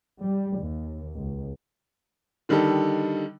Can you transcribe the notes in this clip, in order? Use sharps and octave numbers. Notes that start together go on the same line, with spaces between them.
G3
D#2
C#2
D3 D#3 G3 D#4 A4